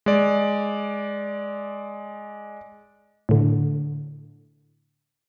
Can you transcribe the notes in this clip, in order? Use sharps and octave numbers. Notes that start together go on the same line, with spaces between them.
G#3 D5
A2 D3